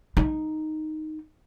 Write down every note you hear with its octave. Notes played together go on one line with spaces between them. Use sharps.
D#4